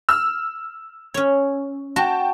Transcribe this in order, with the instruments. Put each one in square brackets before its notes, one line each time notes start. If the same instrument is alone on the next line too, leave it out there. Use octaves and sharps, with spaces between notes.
[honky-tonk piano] E6 F6
[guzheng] C#4 C#5
[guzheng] F#4 [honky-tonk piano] G5 A5